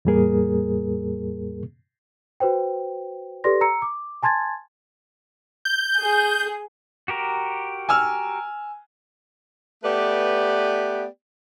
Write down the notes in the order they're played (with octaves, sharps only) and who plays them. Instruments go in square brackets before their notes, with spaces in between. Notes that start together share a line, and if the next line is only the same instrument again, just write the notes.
[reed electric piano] E2 A2 G3 A#3 G#4 A#4
[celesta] F#4 B4 C5 G5
G4 A4 B4 D5 C6 A#6
A#5 E6 C#7
D6
G#5 A5 C6 G#6 A6
[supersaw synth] G6
[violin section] G#4
[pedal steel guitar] F#4 G4 A#4
[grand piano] G#5 E6 F6
[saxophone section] A3 B3 G4 B4 D5